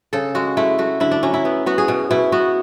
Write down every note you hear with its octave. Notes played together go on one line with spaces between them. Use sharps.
C#3 A4
G#3 F#4
A3 E4
A3 F#4
D3 E4
D4
F#3 C#4
E4
B3
B3 F#4
G#4
B2
B2 E4
B3 F#4